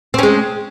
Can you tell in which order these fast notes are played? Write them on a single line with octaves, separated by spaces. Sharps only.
C4 C#4 G#3